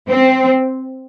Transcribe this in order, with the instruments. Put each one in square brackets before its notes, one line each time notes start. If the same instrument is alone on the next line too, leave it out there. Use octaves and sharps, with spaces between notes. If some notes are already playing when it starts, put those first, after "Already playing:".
[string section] C4